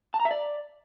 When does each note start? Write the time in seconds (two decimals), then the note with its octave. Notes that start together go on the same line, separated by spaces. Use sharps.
0.14 A5
0.20 A#5
0.25 E5
0.31 D5